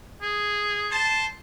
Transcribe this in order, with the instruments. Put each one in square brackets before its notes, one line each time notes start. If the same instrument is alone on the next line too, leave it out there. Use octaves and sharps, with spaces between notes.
[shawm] G#4
[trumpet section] C5 A5